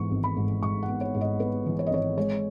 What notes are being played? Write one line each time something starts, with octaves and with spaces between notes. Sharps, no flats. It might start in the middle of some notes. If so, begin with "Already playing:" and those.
Already playing: G#2 E3 B3 C#6
G#1
B5
G#2
G#2 C#6
F#5
B3
C#5
G#2
D#5
B3 B4
E3
C#5
D#5
G#1 C#5
G#3 C#5